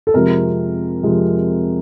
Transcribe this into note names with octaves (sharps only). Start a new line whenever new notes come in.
A4
F2 C3 F3 G#3 A#4
F2 C3 F3 G#3